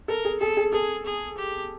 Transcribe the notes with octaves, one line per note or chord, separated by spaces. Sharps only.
A4 A#4
G#4
G#4 A4
G#4
G#4 A4
G#4
G4